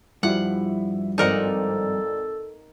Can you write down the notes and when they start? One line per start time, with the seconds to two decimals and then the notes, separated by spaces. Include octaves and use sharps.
0.23 G2 F3 E4 F#4 F#5
1.18 G#1 D#4 A4 A#4 C5 D5 F#5